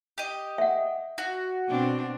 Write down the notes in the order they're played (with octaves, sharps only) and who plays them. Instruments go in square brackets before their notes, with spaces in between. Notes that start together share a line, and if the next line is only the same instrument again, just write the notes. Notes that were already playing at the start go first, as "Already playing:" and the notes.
[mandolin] G4 D#5
[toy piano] E5 F#5
[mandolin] F#4
[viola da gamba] B2 C4 D4